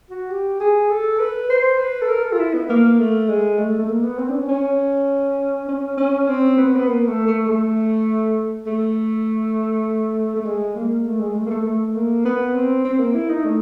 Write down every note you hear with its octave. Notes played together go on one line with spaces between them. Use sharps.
F#4
G4
G#4
A4
B4
C5
B4
A4
A#4
A4
F4
E4
B3
A#3
A3
G#3
A3
A3
A#3
B3
C4
D4
C#4
C#4
C#4
C#4
C4
B3
C4
B3
A#3
A3
A3
A3
A3
A3
G#3
A#3
A3
G#3
A3
A#3
A3
A3
A#3
B3
C4
C4
A#3
E4
D#4
A3